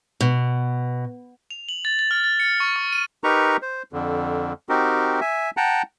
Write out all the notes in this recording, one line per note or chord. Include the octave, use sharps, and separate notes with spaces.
B2
F7
F#7
A6
A6
F6
A6
C#7
C#6
C#6
D#7
D#4 G4 A#4 B4 A#5 C#6
C5
F2 D3
C4 D#4 F#4 G4 A#4
E5 G#5
F#5 G5 A5 A#5